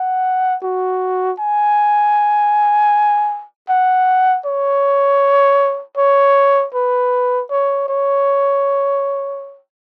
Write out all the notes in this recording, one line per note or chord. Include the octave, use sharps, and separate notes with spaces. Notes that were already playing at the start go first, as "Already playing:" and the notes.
Already playing: F#5
F#4
G#5
F#5
C#5
C#5
B4
C#5
C#5